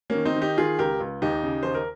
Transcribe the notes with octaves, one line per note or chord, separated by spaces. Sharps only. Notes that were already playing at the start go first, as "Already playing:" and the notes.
A#3 C#4
D#3
C4 D#4
D#3
D#4 G4
D#3 F4 G#4
C#2 G4 A#4
C#2
D#2 D#4 G4
C#3
D#2 C5
A#4